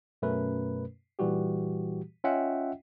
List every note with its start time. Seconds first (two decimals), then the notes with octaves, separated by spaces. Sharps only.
0.22 F#2 B2 A3 C#4 A#4 B4
1.19 A#2 E3 G3 F#4 G4
2.24 C#4 F4 D#5 E5 F#5 G5